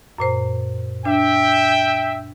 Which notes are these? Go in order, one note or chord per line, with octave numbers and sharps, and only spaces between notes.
F#2 A#2 C5
D4 E5 G5